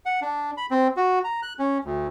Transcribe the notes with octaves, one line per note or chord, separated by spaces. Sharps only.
F#5
D4
B5
C4
F#4
A#5
F#6
C#4
D2